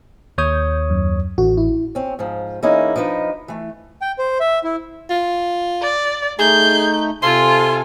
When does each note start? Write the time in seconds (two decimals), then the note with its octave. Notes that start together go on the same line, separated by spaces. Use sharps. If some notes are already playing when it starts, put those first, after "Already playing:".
0.38 D#2 C#5 D#6 G6
0.90 F#2
1.38 A1 F#4
1.57 E4
1.95 C4 C#4
2.19 G#2 F3
2.63 E3 A#3 C#4 D#4 E4 G#4
2.96 F3 D4 D#4 B4
3.48 E3 A3
4.02 G5
4.19 C5
4.40 E5
4.64 E4
5.10 F4
5.82 D5
6.39 A3 D#4 G#4 G6
7.23 C3 F4 A4 G#5 C6